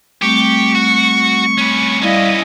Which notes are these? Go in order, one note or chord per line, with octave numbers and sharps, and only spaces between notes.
G3 A3 C4 G4 C#6
F#4
C#4 B4
G3 B3 C#4 E4 D5 D#5 F5